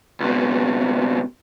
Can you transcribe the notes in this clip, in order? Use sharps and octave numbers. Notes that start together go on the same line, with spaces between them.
C#2 B2